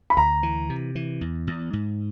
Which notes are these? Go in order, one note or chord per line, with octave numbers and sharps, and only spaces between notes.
B5
D2 A#5
E3
C3
E3
E2
E2
G#2